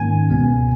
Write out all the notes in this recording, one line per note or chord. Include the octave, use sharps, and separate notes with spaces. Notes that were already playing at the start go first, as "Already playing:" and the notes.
Already playing: G#2 D#3 A#3 C#4 G#5
C#2 B2 G#3 B3